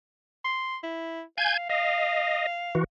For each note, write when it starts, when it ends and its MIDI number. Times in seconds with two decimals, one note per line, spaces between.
0.44 0.77 84
0.83 1.22 64
1.38 1.67 77
1.38 1.57 80
1.38 1.57 91
1.38 1.57 92
1.69 2.46 75
1.69 2.77 77
2.75 2.84 52
2.75 2.84 66